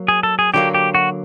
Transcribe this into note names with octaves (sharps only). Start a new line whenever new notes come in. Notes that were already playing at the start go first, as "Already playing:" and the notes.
Already playing: F#3 A#3
G#4
A4
G#4
D3 F#3 A#3 G4
G4
F#4